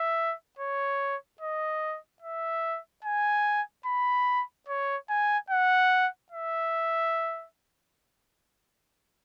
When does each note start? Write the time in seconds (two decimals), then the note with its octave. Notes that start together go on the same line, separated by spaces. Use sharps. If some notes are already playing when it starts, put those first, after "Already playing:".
Already playing: E5
0.59 C#5
1.41 D#5
2.22 E5
3.04 G#5
3.86 B5
4.68 C#5
5.09 G#5
5.50 F#5
6.32 E5